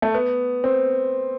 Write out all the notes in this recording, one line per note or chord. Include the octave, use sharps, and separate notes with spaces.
A3
B3
C4